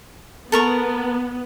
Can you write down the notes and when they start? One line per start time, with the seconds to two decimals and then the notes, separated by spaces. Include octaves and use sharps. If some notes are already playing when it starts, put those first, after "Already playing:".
0.52 B3 A4 A#4 C#6